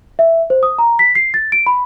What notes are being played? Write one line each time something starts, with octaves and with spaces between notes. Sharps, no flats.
E5
C5
D#6
A#5
B6
C7
A6
D7
B5